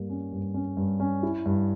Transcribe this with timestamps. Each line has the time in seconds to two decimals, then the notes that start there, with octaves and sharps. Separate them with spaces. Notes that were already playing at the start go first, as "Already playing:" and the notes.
Already playing: G2 G3 A#3
0.09 C#4
0.32 G2
0.54 C#4
0.77 G2
1.00 C#4
1.23 E4
1.46 G2